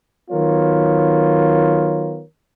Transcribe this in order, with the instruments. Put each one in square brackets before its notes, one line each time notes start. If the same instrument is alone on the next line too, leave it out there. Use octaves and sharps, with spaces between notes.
[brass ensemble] D#3 F#3 B3 F4 A#4 C#5